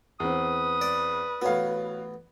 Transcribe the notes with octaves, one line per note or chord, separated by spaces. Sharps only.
E2 C4 B4 D#6
D5
A1 B3 F#4 C#5 F5